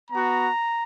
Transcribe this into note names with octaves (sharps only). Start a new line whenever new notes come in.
B3 F#4 A#5